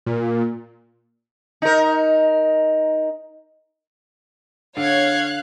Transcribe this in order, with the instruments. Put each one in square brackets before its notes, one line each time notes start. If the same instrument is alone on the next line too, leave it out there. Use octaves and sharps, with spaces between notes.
[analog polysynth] A#2
[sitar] D#4 A#4
[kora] D3 [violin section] C#5 G#6 [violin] F5 F#6